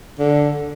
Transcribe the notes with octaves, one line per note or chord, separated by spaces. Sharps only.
D3